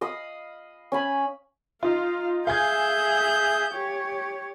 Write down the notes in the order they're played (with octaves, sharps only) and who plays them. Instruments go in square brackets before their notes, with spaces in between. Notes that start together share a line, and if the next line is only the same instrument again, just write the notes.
[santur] D#5 F5 B5 D#6
C#4 G#5 B5
[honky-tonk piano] D#4 F4 [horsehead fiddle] F5
[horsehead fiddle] G#4 E5 [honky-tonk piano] F5 G#5 G#6 [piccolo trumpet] G6
[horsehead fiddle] G4 C#5